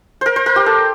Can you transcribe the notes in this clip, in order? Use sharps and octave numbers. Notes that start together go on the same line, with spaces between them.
A#4 C5
C5
A#4
G4
A4